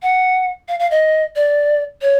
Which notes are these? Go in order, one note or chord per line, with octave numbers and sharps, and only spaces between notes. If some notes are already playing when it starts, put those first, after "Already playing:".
F#5
F5
F5
D#5
D5
C#5